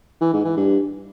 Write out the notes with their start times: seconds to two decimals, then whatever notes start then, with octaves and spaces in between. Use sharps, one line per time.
0.21 E3
0.33 G#2
0.45 E3
0.57 G2